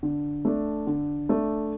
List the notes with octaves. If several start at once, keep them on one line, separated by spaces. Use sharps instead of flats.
D3
A3 D4
D3
A3 D4